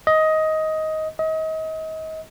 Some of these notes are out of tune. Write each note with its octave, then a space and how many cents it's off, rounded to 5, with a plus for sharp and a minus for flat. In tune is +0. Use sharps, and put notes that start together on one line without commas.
D#5 +15
D#5 +35